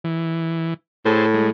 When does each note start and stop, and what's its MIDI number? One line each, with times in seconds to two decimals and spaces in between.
0.04 0.74 52
1.05 1.49 45
1.05 1.26 68
1.05 1.26 69
1.05 1.26 72
1.34 1.50 56